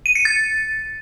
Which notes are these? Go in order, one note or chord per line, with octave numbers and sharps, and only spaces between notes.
D#7
C#7
A6